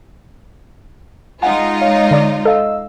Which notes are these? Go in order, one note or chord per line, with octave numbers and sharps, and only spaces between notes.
G#3 D#4 F4 F#5 G#5
C#5 F5
D3 D5 D6
A4 D#5 F5 E6